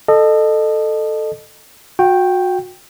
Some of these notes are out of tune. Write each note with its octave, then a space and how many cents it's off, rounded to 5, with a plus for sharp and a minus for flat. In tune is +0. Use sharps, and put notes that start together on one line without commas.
A4 +0 D#5 -30
F#4 -30 G5 +0